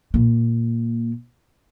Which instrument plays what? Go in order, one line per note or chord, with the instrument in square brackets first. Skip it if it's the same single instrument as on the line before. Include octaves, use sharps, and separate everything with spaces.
[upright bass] A#2 A#3